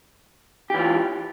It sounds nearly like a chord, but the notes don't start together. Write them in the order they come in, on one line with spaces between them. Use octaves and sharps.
G4 E3 F4